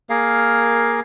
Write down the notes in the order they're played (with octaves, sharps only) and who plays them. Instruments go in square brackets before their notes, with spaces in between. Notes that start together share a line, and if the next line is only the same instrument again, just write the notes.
[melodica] A#3 G#4 A#4 F5